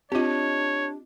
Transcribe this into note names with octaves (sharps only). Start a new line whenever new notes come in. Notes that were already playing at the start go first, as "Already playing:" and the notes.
C4 D4 F4 G4 C#5 D#5